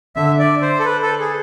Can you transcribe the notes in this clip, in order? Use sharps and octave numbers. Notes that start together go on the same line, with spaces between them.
D3 E5
D5
C5
A4
B4
A4
G#4